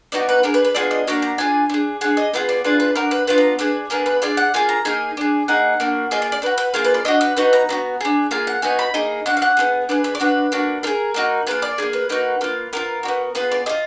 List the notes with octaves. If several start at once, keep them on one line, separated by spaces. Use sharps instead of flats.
B3 D#4 F#4 D5
B4
D4 G#4 A#4
B4
B4
B3 D4 F4 G#4 D5
D#5
A#3 D4 F#4 A#5
A#5
D4 F4 G#4 G#5
D4 G#4
D4 G#4 F#5
D#5
B3 D4 F4 G#4 B4
D5
D4 F4 G#4 B4
B4
D4 F#4 A#4
B4
B3 D4 F4 B4
A#5
D4 G#4 B4
B3 D4 G#4 A#4
B4
D4 F4 G#4 D5
F#5
A#3 F4 G#4 G#5
A#5
A#3 D#4 G#4 G#5
D4 G#4
A#3 D#4 G#4 F#5
A#3 D4 F#4
A#3 F4 G#4 D#5
D5
D5
D4 F#4 B4
B4
A#3 F4 G#4 A#4
B4
D5
D4 F#4 D#5
B4
B3 D#4 F#4 B4
A#5
B3 D4 F#4
D4 G#4
A#3 F4 G#4 G#5
F#5
B3 D#4 F#4 G#5
B5
A#3 D#4 G#4 D#5
D4 F#4 F#5
F5
F#5
B3 D4 G#4
D4 G#4 B4
B4
D5
D4 F#4 B4
A#3 D4 F#4
D4 G#4 A#4
A#3 D#4 F#4
A#3 F4 G#4 B4
D5
A#3 D4 G#4
B4
A#3 D#4 F#4 B4
A#3 D4 F4
B3 D4 F4 A#4
D4 F#4
B3
B3 F4 G#4 B4
D5
F4 G#4 D#5